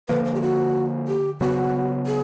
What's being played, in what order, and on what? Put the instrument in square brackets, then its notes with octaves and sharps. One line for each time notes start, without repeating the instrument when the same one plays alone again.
[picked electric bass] D3 F3 A#3 [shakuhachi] B4
[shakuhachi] C5
G4
F#4
G4
[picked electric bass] C#3 F#3 B3 [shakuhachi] F#4
[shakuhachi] G#4